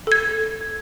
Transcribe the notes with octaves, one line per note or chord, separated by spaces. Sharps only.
A4 G#6